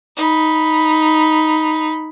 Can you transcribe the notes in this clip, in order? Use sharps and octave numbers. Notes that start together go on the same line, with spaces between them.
D#4 B5